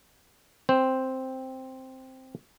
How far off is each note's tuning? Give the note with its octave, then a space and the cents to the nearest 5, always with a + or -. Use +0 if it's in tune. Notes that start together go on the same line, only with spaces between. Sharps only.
C4 +0 C5 +0